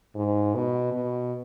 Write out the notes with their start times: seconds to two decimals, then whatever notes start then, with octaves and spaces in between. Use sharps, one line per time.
0.15 G#2
0.55 B2
0.93 B2